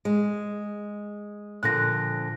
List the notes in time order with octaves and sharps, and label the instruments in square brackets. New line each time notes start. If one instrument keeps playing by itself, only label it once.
[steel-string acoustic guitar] G#3
[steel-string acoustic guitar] A#2 D3 F3 [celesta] F#6 A#6